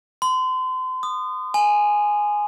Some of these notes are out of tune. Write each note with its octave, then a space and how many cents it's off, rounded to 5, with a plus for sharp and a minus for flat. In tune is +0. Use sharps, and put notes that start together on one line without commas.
C6 -35
D#6 -25
G#5 +0